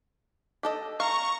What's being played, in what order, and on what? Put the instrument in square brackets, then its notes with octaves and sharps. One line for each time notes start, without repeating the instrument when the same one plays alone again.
[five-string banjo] G4 A4 D#5
[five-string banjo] F5 [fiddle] A#5 [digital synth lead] C#6